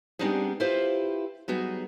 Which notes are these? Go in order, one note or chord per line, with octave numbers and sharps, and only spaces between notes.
G3 B3 C4 D4 D#4 G#4
E4 F4 G4 B4 C5 F5
F#3 G3 B3 D#4 F#4 G#4